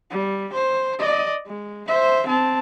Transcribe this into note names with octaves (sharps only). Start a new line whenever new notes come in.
G3
C5
D5 D#5
G#3
C5 E5
C4 A5